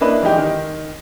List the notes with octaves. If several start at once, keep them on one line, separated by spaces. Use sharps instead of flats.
A#3 D4 E4 B4 D#5
E3 G#3 D#4 G4
D#3